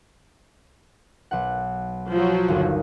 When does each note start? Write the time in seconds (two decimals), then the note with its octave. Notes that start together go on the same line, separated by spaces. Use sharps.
1.31 B1 F#5
2.09 F3 F#3
2.48 G1 D#2 G#4